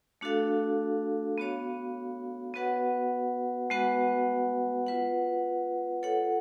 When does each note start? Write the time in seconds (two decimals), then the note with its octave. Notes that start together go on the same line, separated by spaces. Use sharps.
0.21 A3 D4 F#4 A4 F5
1.38 B3 F#4 C#5 F5
2.54 B3 F#4 B4 F#5
3.70 G#3 B3 F#4 B4 F#5
4.87 F4 B4 F#5
6.03 F4 A4 C#5 F#5